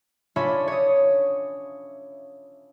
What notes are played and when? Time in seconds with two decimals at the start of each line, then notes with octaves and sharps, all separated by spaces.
0.36 C#4 D4 F4 C#5 E5 B5
0.68 C#5 D#6